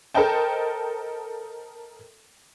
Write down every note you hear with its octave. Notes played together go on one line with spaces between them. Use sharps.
A4 A#4 C5 D#5 G5 A5